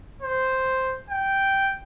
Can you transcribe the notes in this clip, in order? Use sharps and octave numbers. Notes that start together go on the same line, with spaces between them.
C5
G5